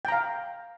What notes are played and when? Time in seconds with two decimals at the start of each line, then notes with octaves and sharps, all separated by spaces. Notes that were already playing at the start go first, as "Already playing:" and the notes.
0.05 G5
0.08 A#5
0.12 F5